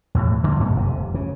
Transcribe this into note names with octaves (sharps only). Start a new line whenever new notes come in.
E2 A2
D3 G3 A3 A#3
G2 B2 A#3
F1 C3
C#3